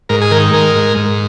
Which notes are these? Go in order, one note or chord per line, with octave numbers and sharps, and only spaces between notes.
G#2 A#4
G#4
D#3 A#4
G#3 A#4
G#2
G#2